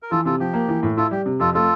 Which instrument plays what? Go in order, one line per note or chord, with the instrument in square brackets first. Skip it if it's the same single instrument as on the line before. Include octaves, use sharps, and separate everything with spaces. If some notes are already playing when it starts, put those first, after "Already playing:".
[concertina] A#4
[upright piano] E3 [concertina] F4 A4
[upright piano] C3 [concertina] F4 A4
[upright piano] F3 [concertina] G4
[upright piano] A#3
E3
A2
[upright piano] E4 [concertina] F4 A4
[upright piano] G3 [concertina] G4
[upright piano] C3
[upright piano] F2 [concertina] F4 A4
[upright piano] A3 [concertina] F4 A4